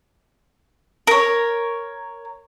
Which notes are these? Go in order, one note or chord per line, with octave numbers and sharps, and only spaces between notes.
A#4 C#5